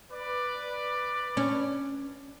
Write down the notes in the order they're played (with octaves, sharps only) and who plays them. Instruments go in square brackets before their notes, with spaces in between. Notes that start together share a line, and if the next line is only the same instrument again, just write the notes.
[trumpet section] B4 D5
[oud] C#4